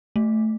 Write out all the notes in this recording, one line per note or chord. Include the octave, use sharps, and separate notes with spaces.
A3